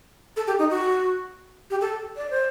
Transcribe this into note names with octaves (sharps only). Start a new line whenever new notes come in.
A4
G4
D#4
F#4
G4
A4
D5
C5